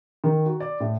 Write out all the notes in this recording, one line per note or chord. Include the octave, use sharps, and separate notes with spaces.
D#3
F#4
D5
A2